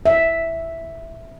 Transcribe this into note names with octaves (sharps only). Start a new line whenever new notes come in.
E5